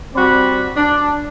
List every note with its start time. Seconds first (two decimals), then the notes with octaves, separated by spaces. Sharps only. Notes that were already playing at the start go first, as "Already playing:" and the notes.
0.15 G3 C4 F#4 D5 B5
0.77 D4